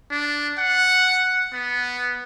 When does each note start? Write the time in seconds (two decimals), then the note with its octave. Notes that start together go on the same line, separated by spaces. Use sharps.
0.11 D4
0.58 F#5
1.53 B3